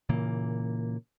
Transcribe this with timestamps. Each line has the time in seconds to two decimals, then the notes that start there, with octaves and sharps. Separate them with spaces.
0.09 A#2 C#3 E3 A#3